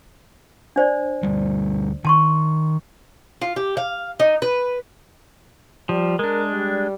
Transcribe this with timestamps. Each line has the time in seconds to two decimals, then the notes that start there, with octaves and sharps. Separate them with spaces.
0.76 D4 C5 D5
1.23 D2 G3
2.05 D#3 A5 C6 C#6
3.41 F4
3.56 G4
3.77 F5
4.20 D#4
4.42 B4
5.89 F3 G3
6.19 G#3 D4 A#4
6.53 G3